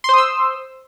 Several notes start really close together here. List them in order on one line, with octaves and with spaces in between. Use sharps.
C6 C5 D#6 E6